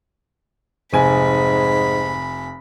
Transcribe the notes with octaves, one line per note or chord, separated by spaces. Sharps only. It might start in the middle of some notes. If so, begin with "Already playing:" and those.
F1 G#2 G#5 B5